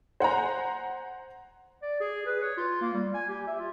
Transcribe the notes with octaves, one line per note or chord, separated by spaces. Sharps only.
C5 F#5 G#5 A#5
D5
G#4
B4
C#5
F4
A#3
G3
G#5
G4
E5
F4